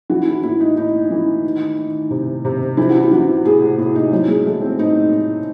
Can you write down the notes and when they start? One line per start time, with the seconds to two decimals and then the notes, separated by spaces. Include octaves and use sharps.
0.10 E3 F#4
0.27 E4
0.43 A2 E4
0.60 D#4
0.77 A2 D#4
1.11 E3
1.44 D#3
1.78 D#3
2.10 C3
2.45 C3
2.77 E3 E4
2.89 F#4
3.00 E4
3.11 E3 F#4
3.45 A2 G#4
3.62 F#4
3.78 A2 E4
3.95 D#4
4.11 A2 F#3
4.28 G#3
4.45 E3 A3
4.61 C4
4.79 A2 D#4
5.12 A2